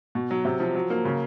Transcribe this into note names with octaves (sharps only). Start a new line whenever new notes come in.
B2
F#3
C3
F3
F#3
A#3
C#3